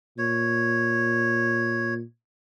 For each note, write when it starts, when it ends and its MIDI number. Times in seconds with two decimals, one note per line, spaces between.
0.18 2.02 46
0.18 1.94 73